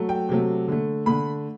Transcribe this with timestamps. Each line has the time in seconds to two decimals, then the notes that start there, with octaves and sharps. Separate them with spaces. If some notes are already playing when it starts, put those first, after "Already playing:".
Already playing: F#3 A3
0.09 G5
0.29 C3 F#3 A3
0.68 D3 A3
1.06 D3 A3 B5